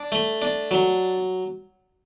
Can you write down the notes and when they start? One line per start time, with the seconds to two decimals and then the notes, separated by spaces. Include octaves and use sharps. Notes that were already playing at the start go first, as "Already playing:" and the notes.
Already playing: D4
0.12 A3
0.42 D4
0.71 F#3